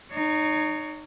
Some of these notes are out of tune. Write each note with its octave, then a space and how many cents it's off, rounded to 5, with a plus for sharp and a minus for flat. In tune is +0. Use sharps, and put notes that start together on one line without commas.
D#4 -25 C#5 +20